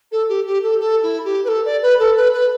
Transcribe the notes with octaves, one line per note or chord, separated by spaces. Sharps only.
A4
G4
G4
A4
A4
E4
G4
B4
A4
D5
B4
A4
B4
B4